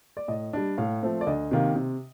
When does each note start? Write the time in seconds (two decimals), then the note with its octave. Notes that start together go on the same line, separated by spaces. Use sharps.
0.17 D5
0.28 A2 D#5
0.53 G3 D4
0.78 A2 F5
1.03 F3 A3 C4
1.21 D5
1.27 D2 D#5
1.51 C3 D#3 A#3
1.76 C3